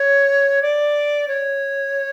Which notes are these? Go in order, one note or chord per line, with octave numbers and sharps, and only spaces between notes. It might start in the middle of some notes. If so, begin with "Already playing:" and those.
Already playing: C#5
D5
C#5